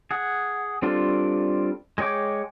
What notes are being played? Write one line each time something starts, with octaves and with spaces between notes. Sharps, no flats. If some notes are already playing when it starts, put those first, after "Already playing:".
G#4 F#5
G3 C4 D4 F4 A4
G#3 G#4 C#5 G5 D6